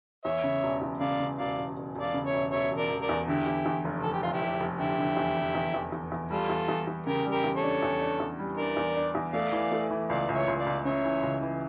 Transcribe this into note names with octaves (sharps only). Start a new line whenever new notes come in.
E2 C#5 E5
C#3
E1
E2
C#3 D5 F5
C#3
E1 D5 F5
E1
E1
E1
D5 F5
C#3
C#5 E5
E1
E1 C#5 E5
E1
A#4 D5
E1
A#4 D5
E2
D3 E4 G4
E2
E2
F1
F1 A4
G4
F1 F4
E4 G4
F1
F1
D3 E4 G4
D3
E2
F1
E2
E2
E2
E2
G3 F4 A4
E2
E2
E2
C#3 G4 A#4
G3
G4 A#4
E2
A4 C#5
D4
E2
D4
E2
G3
D4 A#4 D5
E2
D4
E2
A3 D5 F5
E3
A3
E3
C#2 D5 F5
C#2
C#5 E5
C#2
D5 F5
C#2
C#3 C#5 E5
E3
C#2
E3